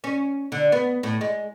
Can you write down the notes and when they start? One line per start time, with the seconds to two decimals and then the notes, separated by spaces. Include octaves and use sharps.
0.04 C#4
0.52 D3
0.72 B3
1.03 A2
1.21 G#3